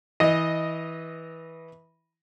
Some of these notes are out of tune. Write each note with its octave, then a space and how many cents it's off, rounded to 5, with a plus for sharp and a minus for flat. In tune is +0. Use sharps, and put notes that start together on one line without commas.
E3 -15 D#5 +0